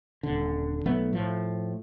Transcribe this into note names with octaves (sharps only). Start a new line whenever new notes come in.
D#1 D3
B1 F#3 A3 B3
A2 F3